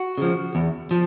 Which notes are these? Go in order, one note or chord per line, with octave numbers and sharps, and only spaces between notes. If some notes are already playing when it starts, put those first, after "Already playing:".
Already playing: F#4
C#3 F3
E2
F3